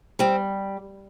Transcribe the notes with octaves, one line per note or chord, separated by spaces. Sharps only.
G3 C4